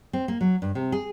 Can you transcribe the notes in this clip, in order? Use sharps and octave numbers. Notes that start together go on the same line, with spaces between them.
C4
A#3
F#3
G2
C3
G#4